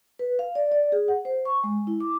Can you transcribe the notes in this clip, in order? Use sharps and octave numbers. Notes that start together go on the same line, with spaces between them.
B4
F5
D5
D5
G#4
F#5
C5
C#6
G#3
E4
D6